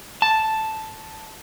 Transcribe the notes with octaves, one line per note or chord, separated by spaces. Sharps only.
A5